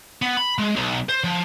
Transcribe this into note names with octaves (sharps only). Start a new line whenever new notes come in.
B3
B5
G#3
B1
C5
F3